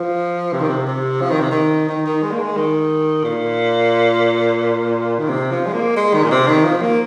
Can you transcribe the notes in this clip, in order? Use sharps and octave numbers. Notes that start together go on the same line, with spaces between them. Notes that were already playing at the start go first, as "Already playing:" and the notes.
Already playing: F3
C3
D#3
C3
C3
F3
D#3
C3
D#3
D#3
D#3
G#3
A#3
G#3
D#3
A#2
D#3
C3
F3
G#3
A#3
G#3
D#3
A#2
C3
D#3
F3
A#3